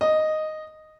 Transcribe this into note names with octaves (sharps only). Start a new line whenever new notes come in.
D#5